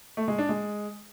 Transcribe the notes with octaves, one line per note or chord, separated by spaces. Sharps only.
A3
G#3
D4
G#3